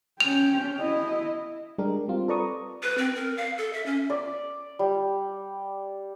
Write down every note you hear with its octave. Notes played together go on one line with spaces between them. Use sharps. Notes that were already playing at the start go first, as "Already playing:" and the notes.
C#4 G5 F7
E4 D#5
G3 G#3 D4 G4 A#4
G3 C4 F4
A4 B4 D5 A#5 C#6 D#6
B4
C4
A#4
F5
A4
E5
C#4
D5
G3